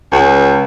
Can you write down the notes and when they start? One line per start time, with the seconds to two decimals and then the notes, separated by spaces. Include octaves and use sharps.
0.12 C#2